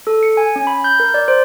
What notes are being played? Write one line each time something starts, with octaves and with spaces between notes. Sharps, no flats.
A4
C#7
G#5
C#4
B5
G6
A#4
D5
C5